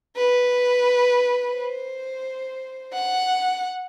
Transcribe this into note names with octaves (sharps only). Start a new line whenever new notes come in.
B4
C5
F#5